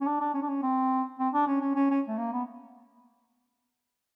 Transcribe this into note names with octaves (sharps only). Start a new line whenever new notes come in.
C#4
D4
D4
C#4
D4
C#4
C4
C4
D4
C#4
C#4
C#4
C#4
A3
A#3
B3